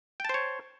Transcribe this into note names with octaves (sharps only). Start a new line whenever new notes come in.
C5 C#5 G5 A5